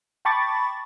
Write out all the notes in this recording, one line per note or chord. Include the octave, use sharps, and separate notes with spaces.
G5 A5 B5 C#6 D6 A6